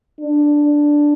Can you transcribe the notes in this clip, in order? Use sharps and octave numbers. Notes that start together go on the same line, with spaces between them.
D4